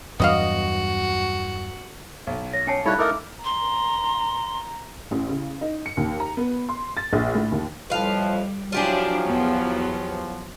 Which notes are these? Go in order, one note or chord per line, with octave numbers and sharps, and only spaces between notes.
E2 G2 F#3 B3 F#4 D#5 F5
B1
C#5 A#6
C#4 C#5 G#5 A5 C7 C#7
G3 D#4 E4 A4 C#5 F5 B5 F#6
D#4 E4 A4 A#4 E5 D6 E6 F6
A#5 C6
A1
C#3
D#4
C#7
D#2
A#5
B3
C6
A6
A#1
A2
D#2
F2 A2 F3 G3 B4 F5
F3 F#3 D4 E4 F4 G4 G#4
E2 B3